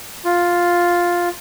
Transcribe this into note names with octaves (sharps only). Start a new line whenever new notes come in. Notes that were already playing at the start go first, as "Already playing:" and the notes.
F4